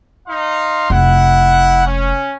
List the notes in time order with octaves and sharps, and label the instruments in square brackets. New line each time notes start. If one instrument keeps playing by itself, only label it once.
[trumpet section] D#4 F5 C6
[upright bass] F1 [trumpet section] E4 F#5
[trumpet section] C#4